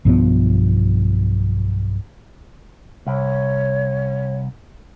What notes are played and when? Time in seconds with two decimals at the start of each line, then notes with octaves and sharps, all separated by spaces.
0.05 B1 G2 F3 B3
3.07 C2 C#5